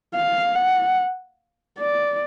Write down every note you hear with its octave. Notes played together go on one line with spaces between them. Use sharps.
F5
F#5
D5